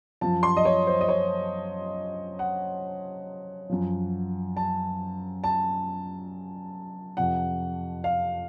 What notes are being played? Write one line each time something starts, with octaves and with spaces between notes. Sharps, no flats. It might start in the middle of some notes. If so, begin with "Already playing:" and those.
F#2 F3 A5
C6
D#5
C#5
C5
D#5
C#5
F#5
F#2 F3
A5
A5
F2 C3 F3 F#5
F5